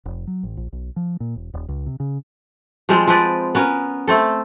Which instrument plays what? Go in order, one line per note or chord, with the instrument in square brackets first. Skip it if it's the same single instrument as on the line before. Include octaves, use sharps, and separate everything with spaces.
[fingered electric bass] F1
F#3
A1
A#1
B1
F3
A#2
E1
D#1
C#2
C3
C#3
[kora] F3 G3 G#3 C4
F3 C4 B4 D5
B3 C#4 A#4
A3 C4 A4